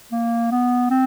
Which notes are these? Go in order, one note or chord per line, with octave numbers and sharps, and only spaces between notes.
A#3
B3
C4